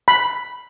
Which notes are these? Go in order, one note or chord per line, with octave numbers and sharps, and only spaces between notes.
B5